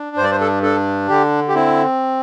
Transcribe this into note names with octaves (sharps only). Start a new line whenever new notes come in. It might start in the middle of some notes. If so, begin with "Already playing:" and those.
Already playing: D4
G2 C5
D5
C5
A4
D4 A4
D3 G4
G4
C4 E4